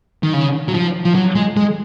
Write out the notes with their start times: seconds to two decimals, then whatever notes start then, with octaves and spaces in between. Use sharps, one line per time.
0.23 D#3
0.33 C#3
0.68 F#3
0.74 F3
1.05 F3
1.14 F#3
1.35 G#3
1.57 G#3